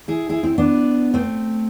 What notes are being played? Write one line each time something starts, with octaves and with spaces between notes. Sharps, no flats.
E4 G#4
E4 G#4
C4 E4
B3 D4
A3 C4